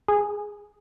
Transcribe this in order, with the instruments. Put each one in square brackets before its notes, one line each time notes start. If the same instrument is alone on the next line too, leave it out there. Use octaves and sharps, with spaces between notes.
[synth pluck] G#4